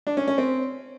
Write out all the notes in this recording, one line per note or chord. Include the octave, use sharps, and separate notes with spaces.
D4
C#4
C#4
C4